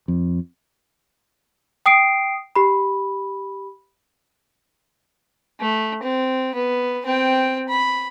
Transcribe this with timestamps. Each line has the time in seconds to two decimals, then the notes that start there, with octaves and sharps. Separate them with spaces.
0.08 F2
1.86 G5 D#6 C7 D7
2.56 G4 B5
5.60 A3
6.03 C4
6.55 B3
7.06 C4 G5
7.69 B5